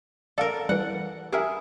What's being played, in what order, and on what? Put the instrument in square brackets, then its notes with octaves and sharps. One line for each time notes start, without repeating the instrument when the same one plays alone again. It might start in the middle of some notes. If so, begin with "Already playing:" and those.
[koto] A4 A#4 [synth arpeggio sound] D5 F5
[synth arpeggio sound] E3 G3 [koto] F#5
[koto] E4 G#4 [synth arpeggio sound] G4 A#4 E5